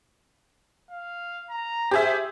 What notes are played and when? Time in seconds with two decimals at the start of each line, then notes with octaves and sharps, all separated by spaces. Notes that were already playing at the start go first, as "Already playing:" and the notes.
0.91 F5
1.50 A#5
1.91 G4 G#4 C5 E5